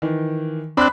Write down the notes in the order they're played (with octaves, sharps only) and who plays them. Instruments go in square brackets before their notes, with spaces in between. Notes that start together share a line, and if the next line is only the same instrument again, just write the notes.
[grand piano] D#3 E3
[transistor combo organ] C4 D4 [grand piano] B5 F#6